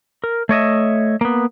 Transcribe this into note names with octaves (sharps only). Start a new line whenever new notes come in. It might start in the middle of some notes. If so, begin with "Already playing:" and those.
A#4
A3 C#5 D#5 E5
A#3 B3